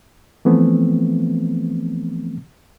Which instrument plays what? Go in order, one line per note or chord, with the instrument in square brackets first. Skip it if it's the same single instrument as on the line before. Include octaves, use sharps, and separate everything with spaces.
[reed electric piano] E3 F3 A3 B3 C4